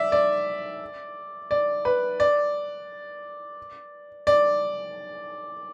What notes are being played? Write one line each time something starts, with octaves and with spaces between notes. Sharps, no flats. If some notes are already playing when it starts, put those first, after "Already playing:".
Already playing: D5 E5
D5
D5
B4
D5
D5